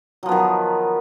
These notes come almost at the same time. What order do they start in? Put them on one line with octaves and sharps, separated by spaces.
F#3 F3 B3 D#3